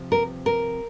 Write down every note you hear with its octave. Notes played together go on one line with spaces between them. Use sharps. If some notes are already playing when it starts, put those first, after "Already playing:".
Already playing: C3 F3 C4
A#4
A#4